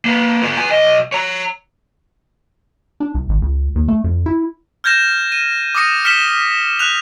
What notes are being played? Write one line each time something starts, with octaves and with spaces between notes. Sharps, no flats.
A#3 B4
B3 F4
B3 G#5
B1 D#5
C#5 A#5
D4
C2
G#1
C#2
D#2
A3
F2
E4
F6 G6 G#6 A#6 E7
D#7
D6 D#6 A#6 C#7 D#7
F6 B6 C#7 E7 G7
F#6 F7